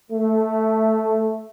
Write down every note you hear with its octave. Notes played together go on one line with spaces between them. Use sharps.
A3